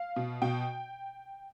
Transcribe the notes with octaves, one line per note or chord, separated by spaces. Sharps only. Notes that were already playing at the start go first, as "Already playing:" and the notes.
Already playing: F5
B2
B2 G5